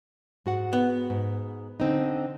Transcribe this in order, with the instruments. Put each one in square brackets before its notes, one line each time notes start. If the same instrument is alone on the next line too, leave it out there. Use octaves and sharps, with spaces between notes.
[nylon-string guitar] G#2 F#4 F#5
[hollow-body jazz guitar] B3
[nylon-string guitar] G#2
D3 C4 D#4